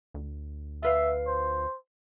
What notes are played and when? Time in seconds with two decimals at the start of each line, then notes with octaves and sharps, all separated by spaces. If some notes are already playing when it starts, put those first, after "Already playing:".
0.14 D2
0.83 F4 B4 E5 F5
1.27 C5